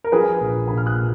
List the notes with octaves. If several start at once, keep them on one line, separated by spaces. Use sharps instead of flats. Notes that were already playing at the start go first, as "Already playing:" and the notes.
A#4
F3 G#4 B4
A#1
A#1 G#5 B5
F6
D#6 F#6
A#2